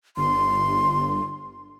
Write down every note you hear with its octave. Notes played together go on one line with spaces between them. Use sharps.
G1 C6